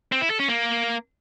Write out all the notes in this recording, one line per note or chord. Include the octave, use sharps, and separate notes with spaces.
C4
E4
A4
C#4
A#3